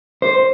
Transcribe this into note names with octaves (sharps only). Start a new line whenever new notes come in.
C5